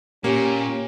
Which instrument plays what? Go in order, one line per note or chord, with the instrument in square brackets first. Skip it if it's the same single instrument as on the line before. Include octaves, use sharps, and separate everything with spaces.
[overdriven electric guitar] A#2 [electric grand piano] A#3 [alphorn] C#4 [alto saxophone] G4